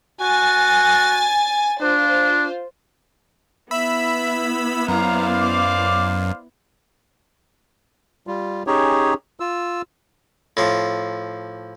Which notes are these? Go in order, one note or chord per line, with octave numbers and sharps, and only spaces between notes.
F#4 G#5 A6
D4 F4 C5
B3 E4 E5 B5 E6
F#2 C5 D5 F5 A#5
D6
G3 F4
C#4 D#4 G4 G#4 C#5
F4 E6
A2 F3